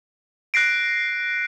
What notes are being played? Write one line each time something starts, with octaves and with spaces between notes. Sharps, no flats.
F#6 A#6 C7 D7